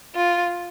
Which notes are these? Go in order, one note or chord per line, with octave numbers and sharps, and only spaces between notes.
F4